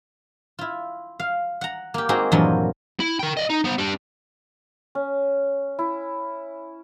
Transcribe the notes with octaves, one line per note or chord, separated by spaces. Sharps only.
E4 F4
F5
F#5 A#5
A#3 G4
G#3 A#3 C4 D#4 F#4 G#4
E2 G2 A#2 F3 F#3 D#5
E4
A#4 G5
D5 D#5
D#4
B3 C5
G3 D4
C#4
E4